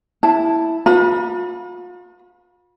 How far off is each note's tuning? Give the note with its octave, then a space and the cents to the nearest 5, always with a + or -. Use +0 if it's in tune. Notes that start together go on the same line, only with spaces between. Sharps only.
E4 +0 A5 +0
F4 +40 B4 +0 B5 -30